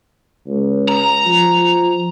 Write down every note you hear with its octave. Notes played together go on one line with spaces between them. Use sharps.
C#2
A#5
F3